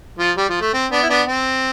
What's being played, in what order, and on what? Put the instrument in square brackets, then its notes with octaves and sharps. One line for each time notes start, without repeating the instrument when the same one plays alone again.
[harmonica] F3
G3
F3
A3
C4
B3 D4
E4
B3 D4
C4